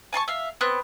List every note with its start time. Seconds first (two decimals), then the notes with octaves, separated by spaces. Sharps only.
0.13 G#5 A5 C6 C#6
0.28 E5 F5
0.61 B3 C4 F#6